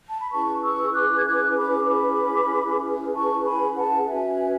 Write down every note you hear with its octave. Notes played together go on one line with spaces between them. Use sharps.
A5
B5
C#4 E4 G#4 B4 A5 C#6
C#6 E6
D6 F#6
G#6
D6 F#6
B5 D6
B5 D6
A5 C#6
G#5 B5
F#5 A5
C#4 F#4 B4 E5 G#5